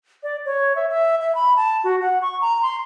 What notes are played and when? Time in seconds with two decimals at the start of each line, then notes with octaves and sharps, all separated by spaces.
0.23 D5
0.46 C#5
0.76 E5
0.89 E5
1.21 E5
1.35 B5
1.56 A5
1.84 F#4
2.02 F#5
2.22 C#6
2.41 A#5
2.62 C6